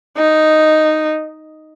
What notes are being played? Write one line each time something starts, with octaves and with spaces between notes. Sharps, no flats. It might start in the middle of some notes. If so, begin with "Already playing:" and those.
D#4